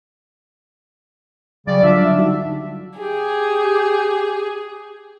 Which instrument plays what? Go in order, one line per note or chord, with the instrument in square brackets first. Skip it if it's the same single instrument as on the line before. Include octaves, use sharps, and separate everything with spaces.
[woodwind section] C#3 G3 D5 [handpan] F#3
[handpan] D3 G3 [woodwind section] D4 F4 E5
[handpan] D#4 F#4
[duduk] G4 [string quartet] G#4